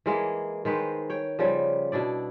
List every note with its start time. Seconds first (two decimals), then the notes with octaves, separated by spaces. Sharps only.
0.06 E3 G#3 A#3
0.65 D#3 G#3 B4 C5
1.10 C#5 G5
1.39 C#3 F3 G3
1.92 B2 D4 E4 D5